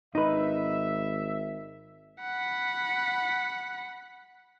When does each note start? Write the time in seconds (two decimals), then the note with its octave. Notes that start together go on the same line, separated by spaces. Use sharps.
0.15 G#1 D#4 B4 E5
2.21 F#5 B5